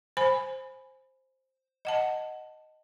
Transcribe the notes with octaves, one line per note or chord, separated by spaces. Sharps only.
C5 G#5 B5
D#5 F#5 A5